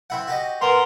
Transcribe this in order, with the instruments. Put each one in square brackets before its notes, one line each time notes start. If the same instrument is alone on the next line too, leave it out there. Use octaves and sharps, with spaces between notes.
[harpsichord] C4 E4 F#5
F#4 G4 D#5
[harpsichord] B3 [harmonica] A#4 C6